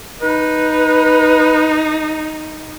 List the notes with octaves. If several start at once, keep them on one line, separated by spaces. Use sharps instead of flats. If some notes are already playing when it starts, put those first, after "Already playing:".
D#4 B4